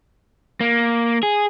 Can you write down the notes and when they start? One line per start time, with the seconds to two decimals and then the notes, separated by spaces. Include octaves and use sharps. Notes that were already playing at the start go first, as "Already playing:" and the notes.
0.60 A#3
1.23 G#4